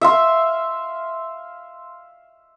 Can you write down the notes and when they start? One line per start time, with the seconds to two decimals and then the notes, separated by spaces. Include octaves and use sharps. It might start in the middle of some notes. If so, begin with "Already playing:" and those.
0.01 E5 F5 C6